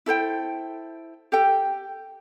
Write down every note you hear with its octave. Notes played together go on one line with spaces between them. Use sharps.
E4 A4 C5 G5
G4 A4 G5